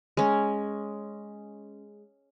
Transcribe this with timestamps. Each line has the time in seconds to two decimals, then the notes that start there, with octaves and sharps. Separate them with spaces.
0.17 G#3 C#4